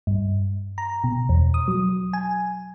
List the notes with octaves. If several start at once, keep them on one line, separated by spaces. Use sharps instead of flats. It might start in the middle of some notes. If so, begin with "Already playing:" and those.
G2
A#5
B2
E2
D#6
F#3
G#5